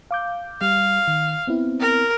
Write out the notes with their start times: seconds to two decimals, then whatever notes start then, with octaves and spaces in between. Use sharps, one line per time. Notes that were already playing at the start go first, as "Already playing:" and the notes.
0.11 F5 D6 G6
0.61 G3 F5
1.08 D#3
1.47 B3 C4 E4
1.80 A#4